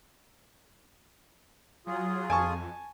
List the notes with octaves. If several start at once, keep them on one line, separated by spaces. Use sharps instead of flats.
F#3 F4 G#4
F2 G#5 A5 C#6